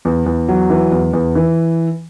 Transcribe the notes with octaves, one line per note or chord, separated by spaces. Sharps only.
E2
E2
F#3
E3
E2
E2
E3